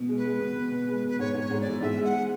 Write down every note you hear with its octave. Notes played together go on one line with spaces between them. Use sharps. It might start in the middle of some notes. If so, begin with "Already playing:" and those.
Already playing: B2
G#3
B4
G#3
B2
B2
B2
G#3
B2 B4
G#2 C#5
G#2
C#5
G#2
D5
E3
G#2 E5
G#3
F#5
G#3